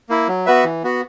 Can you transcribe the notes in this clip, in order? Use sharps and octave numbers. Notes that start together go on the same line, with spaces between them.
A#3 E4
F#3
B3 F#4 B4 E5
E3
B3 F#4